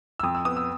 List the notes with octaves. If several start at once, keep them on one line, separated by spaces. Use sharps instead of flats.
E6
F2 D#6
E6
B3 D#6
E6